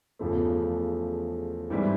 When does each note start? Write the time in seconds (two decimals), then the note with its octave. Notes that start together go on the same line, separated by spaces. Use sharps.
0.19 E2 C#3 F3 A3
1.70 G#2 E3 G3 C4